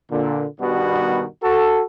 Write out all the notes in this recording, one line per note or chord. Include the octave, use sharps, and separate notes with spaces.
A#2 D3
G2 B2 D#3 G3 B3 F#4
F#4 A4